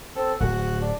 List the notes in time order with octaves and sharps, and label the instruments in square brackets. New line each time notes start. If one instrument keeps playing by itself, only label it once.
[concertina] C4 A4
[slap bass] D1 [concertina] F#4 F#5
[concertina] D4